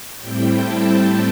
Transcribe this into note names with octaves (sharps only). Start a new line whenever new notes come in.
A2 G3 C4 E4 G5
A5
G5